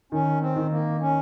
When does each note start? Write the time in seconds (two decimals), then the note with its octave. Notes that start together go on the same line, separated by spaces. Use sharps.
0.12 D#3 C#4
0.41 C4
0.56 D#3
0.70 A#3
1.00 C#4